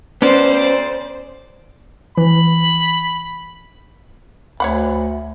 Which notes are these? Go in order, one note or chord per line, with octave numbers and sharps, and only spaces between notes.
D2 B3 C#4 C5 D5
E3 B5
D2 C#5 F#5 B5